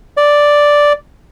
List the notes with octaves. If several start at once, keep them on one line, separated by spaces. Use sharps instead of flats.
D5